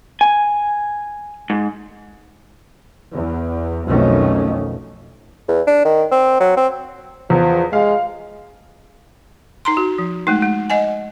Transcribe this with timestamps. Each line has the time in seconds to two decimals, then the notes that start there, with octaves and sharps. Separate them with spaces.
0.21 G#5
1.50 G#2
3.13 E2
3.86 B1 F2 D#3 A3 C#4
5.48 E2
5.67 D4
5.85 D#3
6.12 C4
6.40 F#3
6.57 C4
7.30 E2 F3
7.73 G#3 F5
9.65 D#4 A#5 C6
9.77 F#4
9.98 F3
10.27 G#3 A3 D#4
10.42 G#3
10.70 D#5 F#5 G#5